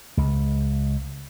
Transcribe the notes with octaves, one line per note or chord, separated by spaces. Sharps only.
C#2